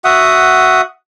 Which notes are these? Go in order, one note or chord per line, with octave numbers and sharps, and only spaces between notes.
F#4 E5 F#5 D#6